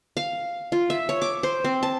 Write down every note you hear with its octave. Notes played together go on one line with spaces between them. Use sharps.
F5
F4
E5
C#5
D6
C5
C4
A5